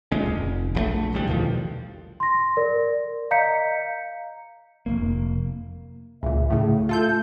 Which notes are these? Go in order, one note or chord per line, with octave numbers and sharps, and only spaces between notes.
D2 A#2 G#3 C#4
F1
A#1 F3 A3
D#1 A1 D2 G3
E2 B2 D#3 F3
C6 A#6
A#4 D5
D#5 F5 A#5 G6 B6 C#7
F1 D#2 A#3
C#2 A#2 E5
A2 C#3 A3
F4 A4 G6